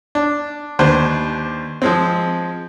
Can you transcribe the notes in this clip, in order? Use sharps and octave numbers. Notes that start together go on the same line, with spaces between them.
D4
D#2 D4 B4 C5
F3 G#3 C4